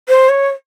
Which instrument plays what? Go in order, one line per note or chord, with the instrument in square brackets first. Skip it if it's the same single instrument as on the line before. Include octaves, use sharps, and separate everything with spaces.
[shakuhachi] C5
C#5